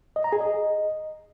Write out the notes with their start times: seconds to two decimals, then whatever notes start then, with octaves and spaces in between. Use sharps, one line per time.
0.16 D#5
0.24 A#5
0.33 G#4
0.41 D#5